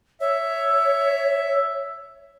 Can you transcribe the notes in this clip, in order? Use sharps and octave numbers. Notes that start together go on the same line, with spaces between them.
C#5 E5